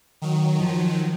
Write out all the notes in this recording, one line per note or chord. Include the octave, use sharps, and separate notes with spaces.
D#3 F#3
F3